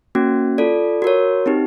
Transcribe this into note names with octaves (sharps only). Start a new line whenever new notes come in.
A#3 C#4 F#4
F4 A4 D5
F#4 A#4 C#5
C4 D#4 G4